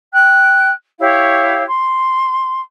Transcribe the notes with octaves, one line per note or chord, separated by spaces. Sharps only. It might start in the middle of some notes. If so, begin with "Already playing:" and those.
G5 F#6
E4 G4 C#5 F5
C6